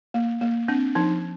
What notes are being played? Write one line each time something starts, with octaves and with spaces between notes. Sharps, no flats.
A#3
A#3
C4 D4
F3 D#4